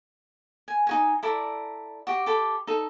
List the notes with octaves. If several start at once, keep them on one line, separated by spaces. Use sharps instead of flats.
G#5
D#4 F#4 G#5
E4 A4 D5 A#5
F#4 G4
G4 A4 B5
D#4 A4